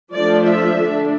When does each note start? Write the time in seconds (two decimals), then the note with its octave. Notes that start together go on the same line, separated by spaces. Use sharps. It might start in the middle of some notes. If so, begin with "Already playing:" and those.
0.14 F3 A3 D4 D5
0.46 E5
0.78 D3 A3 D4